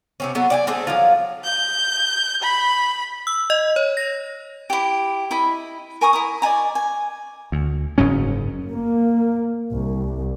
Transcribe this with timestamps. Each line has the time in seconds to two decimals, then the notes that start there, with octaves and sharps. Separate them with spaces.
0.20 C3 C4 C#4
0.35 F#3 B3 A4
0.50 D5 G5 G#5
0.67 A3 C4 D4 G#4
0.87 F3 F#3 F4
1.44 G6
2.42 B5
3.27 E6
3.50 D#5
3.76 C#5
3.97 A#6
4.70 E4 G4
5.31 E4 D#5 B5
6.01 A#4 G#5 C#6 D#6
6.13 E4 A#5 D#6
6.42 D5 D#5 G#5 A#5
6.75 G#5
7.52 D2
7.98 F#1 G#2 F#3 C#4
8.68 A#3
9.72 C2